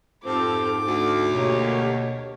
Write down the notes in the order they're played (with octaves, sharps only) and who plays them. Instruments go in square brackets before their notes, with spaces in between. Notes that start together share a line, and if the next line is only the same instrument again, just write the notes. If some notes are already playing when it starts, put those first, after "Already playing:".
[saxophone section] F2 F3 [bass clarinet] G#2 [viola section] C4 G4 A4 [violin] D6
[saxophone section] D2 [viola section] A4
[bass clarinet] B2 [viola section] A#3 G4 C#5